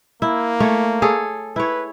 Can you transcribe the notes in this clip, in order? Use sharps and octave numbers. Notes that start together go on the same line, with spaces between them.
A#3 E4
A3 C#5
G#4 A4 C#5
E4 B4 C#5